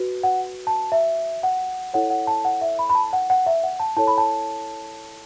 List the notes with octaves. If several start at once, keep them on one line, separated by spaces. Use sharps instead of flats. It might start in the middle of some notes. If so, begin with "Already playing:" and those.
Already playing: F#4 B4
F#5
A5
E5
F#5
E4 A4 C#5 F#5
F#5
A5
F#5
E5
B5
B5
A5
F#5
F#5
E5
F#5
A5
E4 A4 C#5 A5
B5
A5